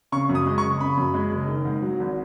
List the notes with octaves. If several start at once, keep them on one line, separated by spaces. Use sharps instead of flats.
C#3 C#6
F#2
D#6
G#3
C#6
F#1
C#3 B5
F#2
G#3
F#1
D#3
G#2
F#3
G#1